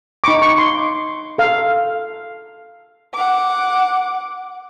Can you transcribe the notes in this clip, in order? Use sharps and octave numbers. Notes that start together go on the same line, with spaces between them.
D#4 B5 C#6 D6
C#6
C6
A4 F5
F#5 D6